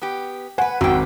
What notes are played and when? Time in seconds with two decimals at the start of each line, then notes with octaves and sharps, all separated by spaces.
0.02 B3 G4
0.58 B4 C5 F#5 G#5
0.81 G#1 F#2 F#4 G5 D6